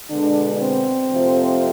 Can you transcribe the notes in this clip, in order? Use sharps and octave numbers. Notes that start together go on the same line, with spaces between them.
B2 D3 G#3 B3 D4
C4
F2 C3 F3 A3